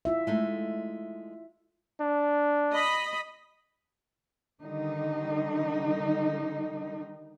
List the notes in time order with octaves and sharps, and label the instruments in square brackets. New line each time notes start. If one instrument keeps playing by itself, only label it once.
[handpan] E4 F4 E5
[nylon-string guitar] G#3 A3 D#4
[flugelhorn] D4
[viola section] D#5 B5
[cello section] D3 D#3 G3 D#4